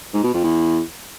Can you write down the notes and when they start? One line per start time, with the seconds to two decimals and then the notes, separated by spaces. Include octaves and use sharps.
0.13 G#2
0.24 B2
0.34 F2
0.44 E2